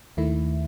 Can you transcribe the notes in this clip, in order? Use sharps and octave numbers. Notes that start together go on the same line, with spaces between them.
D#2 D#3 A3 E4